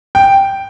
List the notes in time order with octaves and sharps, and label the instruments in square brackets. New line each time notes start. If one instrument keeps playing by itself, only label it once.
[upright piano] G5